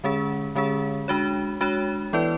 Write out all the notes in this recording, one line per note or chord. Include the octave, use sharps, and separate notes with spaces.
D3 G#3 C#4 G#4
D3 G#3 C#4 G#4
G#3 D4 F#4 C#5
G#3 D4 F#4 C#5
E3 B3 E4 B4 D5